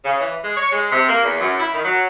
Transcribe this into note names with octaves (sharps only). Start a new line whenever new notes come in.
C#3
E3
G#3
C#5
G#3
C3
A#3
E2
F#2
E4
D#3
F#3